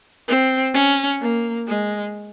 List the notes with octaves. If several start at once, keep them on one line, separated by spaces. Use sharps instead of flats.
C4
C#4
A#3
G#3